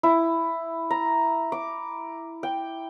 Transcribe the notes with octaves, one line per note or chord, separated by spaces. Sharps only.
E4
A#5
D6
G5